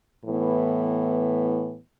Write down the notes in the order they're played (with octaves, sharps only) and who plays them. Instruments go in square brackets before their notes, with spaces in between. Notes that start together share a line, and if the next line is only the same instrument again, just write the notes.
[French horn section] A2 E3 B3